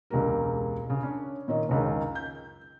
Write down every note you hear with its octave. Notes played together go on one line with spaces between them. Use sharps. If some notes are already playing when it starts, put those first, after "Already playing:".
E1 C#2 A#3 G4 A#4
C#3
C#4 D4
A#2 D#3 C#5 D#5
F#1 C#2 D#3
G6